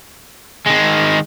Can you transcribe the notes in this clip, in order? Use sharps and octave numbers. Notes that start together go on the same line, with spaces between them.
D#3 G#3